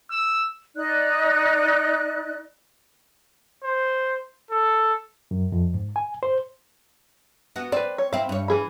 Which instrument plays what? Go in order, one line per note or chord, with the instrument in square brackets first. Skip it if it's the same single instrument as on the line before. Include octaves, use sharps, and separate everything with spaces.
[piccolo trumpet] E6
[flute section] D#4 D5 F#6
[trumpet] C5
A4
[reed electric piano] F#2
F2
G#2
G#5
C5
[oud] B3 F#4
[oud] C4 [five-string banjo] B4 D5
[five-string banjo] C#5
[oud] C4 E4 [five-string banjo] F5
[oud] G2 C#5
[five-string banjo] E3 G#4 B5